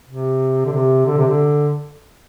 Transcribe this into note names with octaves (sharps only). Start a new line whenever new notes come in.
C3
D3
C3
D3
C3
D3